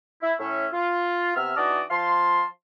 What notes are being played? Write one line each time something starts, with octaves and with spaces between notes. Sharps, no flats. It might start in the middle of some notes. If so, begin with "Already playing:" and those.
E4
A2 C#4 E5
F4
C3 B3 E5 E6 F6
E3 D4 D#4 F#4 D5 D#5
F3 F5 A5 C6